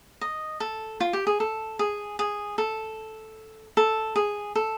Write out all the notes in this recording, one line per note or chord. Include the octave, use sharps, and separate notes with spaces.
D#5
A4
F4
G4
G#4
A4
G#4
G#4
A4
A4
G#4
A4